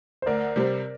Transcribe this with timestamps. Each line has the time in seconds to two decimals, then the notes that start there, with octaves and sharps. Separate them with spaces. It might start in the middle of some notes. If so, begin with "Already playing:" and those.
0.22 C5
0.26 D2 A#4 D5
0.56 C3 G3 C4